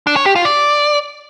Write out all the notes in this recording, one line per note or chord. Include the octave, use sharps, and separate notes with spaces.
D4
C#5
G4
F4
D5